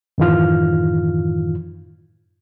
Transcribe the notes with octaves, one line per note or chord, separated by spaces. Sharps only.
F#2 A2 D#3 E3 F4 F6